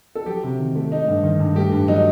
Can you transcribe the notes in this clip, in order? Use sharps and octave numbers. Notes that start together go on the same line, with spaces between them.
A4
F#3 G4
C3
D#3
A3
A3 D#4
G2
D#3
G2
A3 G4
G2
F#3 D#4